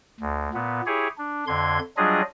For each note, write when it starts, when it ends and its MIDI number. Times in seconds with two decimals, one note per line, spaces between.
0.20 0.49 38
0.54 0.81 46
0.54 0.81 59
0.86 1.08 64
0.86 1.08 67
0.86 1.08 68
0.86 1.08 73
1.18 1.44 62
1.47 1.79 41
1.47 1.79 50
1.47 1.79 84
1.47 1.79 92
1.97 2.21 54
1.97 2.21 55
1.97 2.21 62
1.97 2.21 65
1.97 2.21 68
1.97 2.21 75